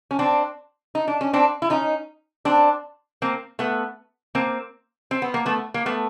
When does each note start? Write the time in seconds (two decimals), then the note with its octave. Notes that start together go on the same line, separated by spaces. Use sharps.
0.11 C#4
0.19 C4 D4
0.95 D#4
1.08 D4
1.21 C#4
1.33 C4 D4
1.62 E4
1.70 C#4 D#4
2.45 C4 D4
3.22 A#3 C4
3.59 A3 B3
4.35 A#3 C4
5.11 C4
5.22 B3
5.34 A#3
5.46 A3 B3
5.74 A#3
5.86 A3 B3